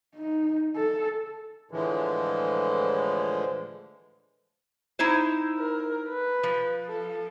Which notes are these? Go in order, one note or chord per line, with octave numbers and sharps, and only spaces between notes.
D#4
A4
A2 D3 E3 F3 G#3
D#4 E4 C5
A#4
B4
F3
A4